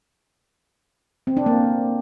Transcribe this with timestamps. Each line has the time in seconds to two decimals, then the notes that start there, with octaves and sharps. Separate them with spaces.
1.27 C4
1.37 D4
1.46 A#3